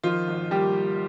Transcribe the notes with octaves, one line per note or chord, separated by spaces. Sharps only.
D#3 F3 F4
G#1
G3 A#3 G4